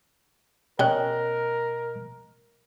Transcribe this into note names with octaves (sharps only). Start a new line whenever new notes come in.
B2 C#4 A#4 D#5 G5 F#6